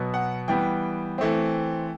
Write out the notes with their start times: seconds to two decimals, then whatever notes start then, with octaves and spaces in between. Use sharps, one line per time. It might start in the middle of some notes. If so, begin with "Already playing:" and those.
Already playing: B2 F#3 B3
0.14 F#5
0.48 E3 G3 B3 G5
1.18 E3 A3 C4